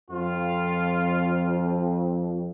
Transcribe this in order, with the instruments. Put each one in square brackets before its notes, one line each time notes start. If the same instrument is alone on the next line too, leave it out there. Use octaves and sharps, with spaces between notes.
[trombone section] F2 [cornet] F4